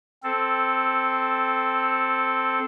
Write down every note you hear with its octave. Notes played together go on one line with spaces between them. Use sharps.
C4 A4